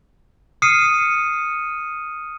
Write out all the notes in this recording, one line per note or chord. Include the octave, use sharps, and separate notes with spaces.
D#6 F6 C7 C#7 D#7